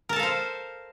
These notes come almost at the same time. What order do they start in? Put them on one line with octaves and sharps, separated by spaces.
A#4 A5 A4 F5 C5